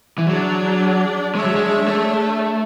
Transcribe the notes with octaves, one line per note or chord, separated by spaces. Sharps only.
E3
F#3 D4 G#4 D5
G#3 D4 G#4 C#5 E5
F#3
G#3
A3